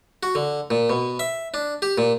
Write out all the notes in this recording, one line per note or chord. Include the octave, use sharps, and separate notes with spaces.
F#4
D3
A#2
B2
E5
D4
G4
A#2